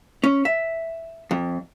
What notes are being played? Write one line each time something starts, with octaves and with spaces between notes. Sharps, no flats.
C#4
E5
F2